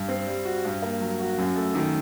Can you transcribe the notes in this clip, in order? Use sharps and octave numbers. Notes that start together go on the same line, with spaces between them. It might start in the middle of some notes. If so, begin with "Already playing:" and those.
Already playing: G2
C4
G3
F#4
G2
A#3
F#3
F#4
F#2
A3
D#3